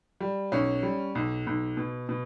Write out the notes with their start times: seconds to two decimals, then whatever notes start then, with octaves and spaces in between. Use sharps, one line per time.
0.20 G3
0.52 B1 C#4
0.83 G3
1.15 B1
1.47 B1
1.77 B2
2.09 B2